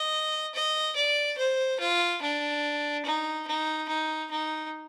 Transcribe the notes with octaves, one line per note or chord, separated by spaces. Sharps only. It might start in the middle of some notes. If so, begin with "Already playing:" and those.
Already playing: D#5
D#5
D5
C5
F4
D4
D#4
D#4
D#4
D#4